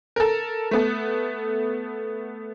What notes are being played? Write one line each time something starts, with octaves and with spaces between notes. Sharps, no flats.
A4 A#4
A3 B3 A4